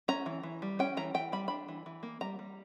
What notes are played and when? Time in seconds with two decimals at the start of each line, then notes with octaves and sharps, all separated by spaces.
0.08 C#4 A#5
0.26 E3
0.43 E3
0.62 G3
0.79 C#4 G5
0.97 E3 A#5
1.14 E3 G5
1.32 G3 B5
1.48 D4 B5
1.68 E3
1.86 E3
2.03 A#3
2.21 G3 A#5
2.39 G3